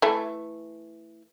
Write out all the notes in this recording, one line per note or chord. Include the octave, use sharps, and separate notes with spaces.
E3 A3